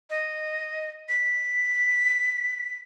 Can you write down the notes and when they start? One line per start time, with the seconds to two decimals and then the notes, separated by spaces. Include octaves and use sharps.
0.10 D#5
1.09 B6